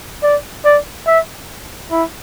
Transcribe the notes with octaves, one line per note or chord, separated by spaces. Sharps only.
D5
D5
E5
E4